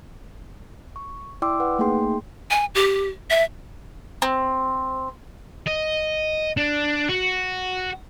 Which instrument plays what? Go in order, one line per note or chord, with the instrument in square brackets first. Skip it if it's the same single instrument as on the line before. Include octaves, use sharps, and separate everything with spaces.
[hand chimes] C#6
E4 D5 G5 C6 D6 E6
B4 F#5
A3 A#3 D#4 G#4 G5 C6
[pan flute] G#5
G4
E5
[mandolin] C4
[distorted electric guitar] D#5
D4
F#4